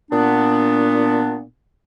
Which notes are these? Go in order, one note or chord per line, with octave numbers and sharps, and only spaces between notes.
A#2 B3 D4